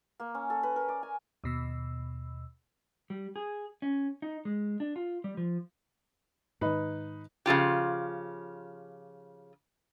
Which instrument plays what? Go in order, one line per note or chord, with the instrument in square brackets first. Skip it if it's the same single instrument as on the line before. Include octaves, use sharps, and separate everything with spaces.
[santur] A#3
C#4
A4
B4
A#4
D5
G#5
[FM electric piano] D#2 B2 E6
[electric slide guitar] G3
G#4
C#4
D#4
G#3
D4
F4
G3
F3
[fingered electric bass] G#2 D#3 [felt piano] D#4 B4
[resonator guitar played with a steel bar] C#3 F3 F4 G4